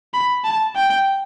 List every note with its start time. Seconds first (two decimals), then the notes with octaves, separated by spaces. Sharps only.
0.14 B5
0.44 A5
0.75 G5